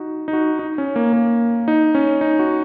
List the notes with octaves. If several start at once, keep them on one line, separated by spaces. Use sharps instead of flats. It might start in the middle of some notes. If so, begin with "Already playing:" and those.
Already playing: D#4 F#4
D#4
F#4
D#4
C#4
A#3
A#3
D#4
C#4
D#4
F#4